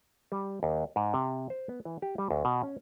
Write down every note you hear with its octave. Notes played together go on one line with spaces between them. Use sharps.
G3
D#2
G#2
C3
C5
B3
E3
G4
G3
D2
B2
C#4